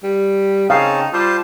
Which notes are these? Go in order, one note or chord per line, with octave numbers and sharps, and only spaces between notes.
G3
C#3 C4 C#4 D#4 F5 A5
G3 F4 C5 A5